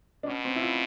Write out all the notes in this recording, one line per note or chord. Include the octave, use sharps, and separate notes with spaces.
D4
B2 C#4
C4
E4
F4